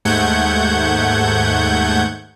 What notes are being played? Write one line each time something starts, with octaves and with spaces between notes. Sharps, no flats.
D#2 G#2 A3 F#5 G6 G#6